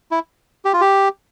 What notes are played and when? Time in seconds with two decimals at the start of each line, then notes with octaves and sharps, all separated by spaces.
0.11 E4
0.65 G4
0.73 F4
0.81 G4